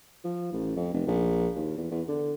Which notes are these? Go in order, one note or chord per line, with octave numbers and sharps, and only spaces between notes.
F3
A1
F2
F1
A#1
D#2
E2
E2
D3